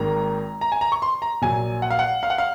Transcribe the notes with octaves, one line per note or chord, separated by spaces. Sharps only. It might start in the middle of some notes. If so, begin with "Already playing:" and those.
Already playing: G#1 G#2 D#3 A#3 A#5
A#5
G#5
A#5
C#6
C6
A#5
A#1 A#2 F#3 G#5
F#5
F5
F#5
F5
F#5
F5